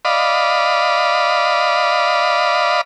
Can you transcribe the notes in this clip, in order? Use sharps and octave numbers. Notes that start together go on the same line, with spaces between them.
D5 D#5 F5 B5